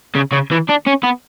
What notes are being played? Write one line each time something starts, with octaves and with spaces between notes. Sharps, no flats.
C#3
C#3
E3
D4
C#4
B3